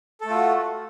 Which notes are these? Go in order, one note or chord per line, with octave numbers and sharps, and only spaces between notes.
A3 F4 F#4 A4